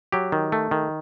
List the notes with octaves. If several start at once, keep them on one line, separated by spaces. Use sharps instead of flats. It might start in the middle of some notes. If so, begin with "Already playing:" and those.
F#3 G4
D#3
A3
D#3